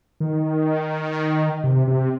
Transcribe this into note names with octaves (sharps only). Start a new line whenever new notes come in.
D#3
C3
C3